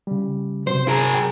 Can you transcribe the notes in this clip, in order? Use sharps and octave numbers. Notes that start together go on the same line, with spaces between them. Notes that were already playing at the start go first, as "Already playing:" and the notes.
C#3 G3
C3 F#3 C5
G#4 A#4
G5